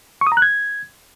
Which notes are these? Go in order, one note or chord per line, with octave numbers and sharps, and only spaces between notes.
C#6
D#6
A#5
F#6
G#6